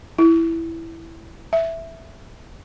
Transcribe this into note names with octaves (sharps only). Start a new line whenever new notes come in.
E4
E5